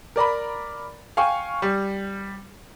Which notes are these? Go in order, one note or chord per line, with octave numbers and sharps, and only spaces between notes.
A#4 D5 A#5 B5
F5 G5 G#5 C#6
G3